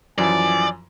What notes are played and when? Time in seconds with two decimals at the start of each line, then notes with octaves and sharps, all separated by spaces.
0.18 F#2 E3 F3 D5 G#5